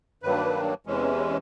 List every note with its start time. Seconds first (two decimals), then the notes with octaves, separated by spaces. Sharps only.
0.23 G2 D#3 F#3 A#3 D4 B4
0.86 E2 C3 E3 G#3 C#4